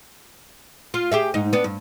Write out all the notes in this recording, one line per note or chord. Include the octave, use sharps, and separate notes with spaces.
F4
G4 G#4 E5
G#2 D#4
B3 D4
G2